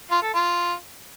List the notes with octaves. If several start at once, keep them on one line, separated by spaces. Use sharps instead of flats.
F4
A4
F4